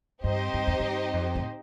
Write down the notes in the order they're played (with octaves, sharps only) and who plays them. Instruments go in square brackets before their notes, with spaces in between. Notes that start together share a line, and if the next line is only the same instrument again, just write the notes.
[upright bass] G2 [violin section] C4 D#4 G4 C5 D#5
[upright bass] G2
F2
G2
F2
A2